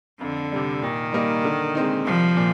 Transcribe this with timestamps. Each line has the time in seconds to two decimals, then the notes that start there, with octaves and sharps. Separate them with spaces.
0.21 F2 D3
0.52 C3 G3
0.82 A#2 D#3
1.13 G3 A#3 D#4
1.44 D3
1.75 G#3 C4 D#4
2.06 C2 F3
2.37 A#2